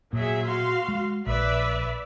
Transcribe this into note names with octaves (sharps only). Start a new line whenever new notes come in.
A#2 F#3 G#4 E5
F#4 F5 C6
G#3
A#1 B4 D5 E5